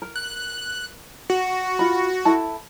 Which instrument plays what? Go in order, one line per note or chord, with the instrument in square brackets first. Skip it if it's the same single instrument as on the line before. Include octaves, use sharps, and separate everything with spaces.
[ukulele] A#4
[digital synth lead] F#6
F#4
[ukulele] F4 B5
E4 A4 A5